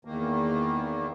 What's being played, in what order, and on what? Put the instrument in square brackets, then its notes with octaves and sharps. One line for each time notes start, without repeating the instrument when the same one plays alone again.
[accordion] E2 D#3 A#3